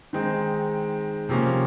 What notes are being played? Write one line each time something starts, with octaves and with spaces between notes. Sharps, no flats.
D#3 G#3 C4 D#4
C3 F3 A#3 C#4